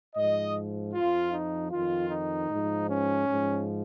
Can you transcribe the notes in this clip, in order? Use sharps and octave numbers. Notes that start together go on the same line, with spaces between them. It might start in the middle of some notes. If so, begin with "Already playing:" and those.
G#2 F3 D#5
F2 F3 F4
D#4
F2 D#3 F4
D#4
G#2 F3
C#4
G#2 F3